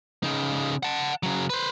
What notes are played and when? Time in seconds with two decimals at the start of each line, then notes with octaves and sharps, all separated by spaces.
0.23 C#3 D#4
0.83 F#5 A5
1.23 C#3 F#3
1.50 B4 C5